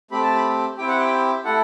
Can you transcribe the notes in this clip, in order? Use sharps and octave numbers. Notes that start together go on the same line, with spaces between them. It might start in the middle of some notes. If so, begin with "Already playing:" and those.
A3 C4 G4 B5
A5
B5
C4 E4 G4 G5
F#5
G5
A3 E4 A4 F#5